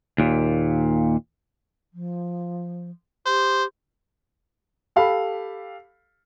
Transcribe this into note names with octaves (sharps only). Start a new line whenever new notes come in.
D#2 A#2
F3
G4 C5
G4 A4 F5 B5